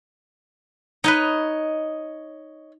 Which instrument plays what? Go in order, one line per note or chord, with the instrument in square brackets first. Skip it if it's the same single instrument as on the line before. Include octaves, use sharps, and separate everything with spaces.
[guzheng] D#4 B4 [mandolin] C#5 D#5